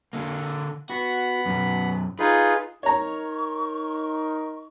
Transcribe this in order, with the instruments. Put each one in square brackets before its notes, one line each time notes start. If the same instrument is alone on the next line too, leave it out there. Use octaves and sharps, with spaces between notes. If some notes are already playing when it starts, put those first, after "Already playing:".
[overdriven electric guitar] D3 A#3
[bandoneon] B3 B5 [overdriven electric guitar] F#4
[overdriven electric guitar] F#2 B2
[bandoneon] D#4 F4 G#4 [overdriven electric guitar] B4
[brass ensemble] D#4 A#4 [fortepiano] C#5 A#5 [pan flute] C#6